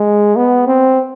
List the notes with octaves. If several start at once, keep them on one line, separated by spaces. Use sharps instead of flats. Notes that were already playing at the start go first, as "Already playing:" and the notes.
Already playing: G#3
B3
C4